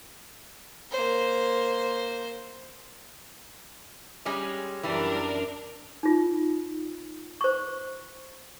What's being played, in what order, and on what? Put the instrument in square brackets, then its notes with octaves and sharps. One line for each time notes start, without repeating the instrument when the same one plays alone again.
[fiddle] A#3 C5
[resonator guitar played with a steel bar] G3 G#3 C#4
[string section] F#2 D4 A#4 [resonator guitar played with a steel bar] E3 G3
[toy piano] D#4 F4
C5 C#6